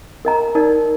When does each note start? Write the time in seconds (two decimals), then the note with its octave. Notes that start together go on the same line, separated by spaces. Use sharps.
0.25 A#4 D#5 A#5
0.55 D#4 A#4 D5